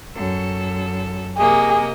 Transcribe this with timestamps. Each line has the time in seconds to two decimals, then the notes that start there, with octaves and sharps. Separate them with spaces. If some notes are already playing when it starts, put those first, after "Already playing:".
0.15 F#2 A4
1.37 C3 A#3 G#4 D#5